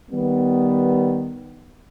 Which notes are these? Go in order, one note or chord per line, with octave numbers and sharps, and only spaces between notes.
D#3 G3 B3